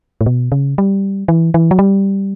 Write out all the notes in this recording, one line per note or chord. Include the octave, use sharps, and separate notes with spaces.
A2
B2
C#3
G3
E3
E3
F#3
G3